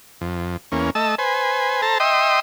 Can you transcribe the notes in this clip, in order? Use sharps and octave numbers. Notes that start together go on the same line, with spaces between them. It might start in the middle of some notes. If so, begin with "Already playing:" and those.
F2
E2 A#3 C#4
A3 D#5 A5 E6
B4 C5 G#5
A4 C5 A5 A#5
D#5 E5 G5 C6 D#6